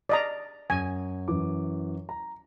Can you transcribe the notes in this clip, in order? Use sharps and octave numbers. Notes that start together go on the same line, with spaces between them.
D5 D#5 A#5
F#2 G#5
F#2 E3 D6
A#5